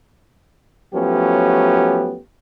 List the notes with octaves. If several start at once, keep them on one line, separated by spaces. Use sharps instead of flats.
F3 F#3 A3 B3 C#4 G4